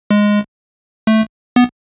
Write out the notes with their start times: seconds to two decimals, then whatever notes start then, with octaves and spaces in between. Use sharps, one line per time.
0.11 G#3
1.07 A3
1.56 B3